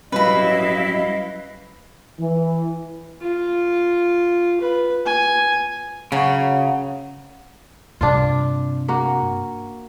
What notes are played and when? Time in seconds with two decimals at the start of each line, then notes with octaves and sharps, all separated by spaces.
0.12 F#3 G3 C#4 E4 B4 D#5 F5 B5
2.20 E3
3.21 F4
4.61 B4
5.06 G#5
6.12 C#3 F#3 F#4 C#5
8.01 G2 C3 D4 F4
8.88 A#3 F#4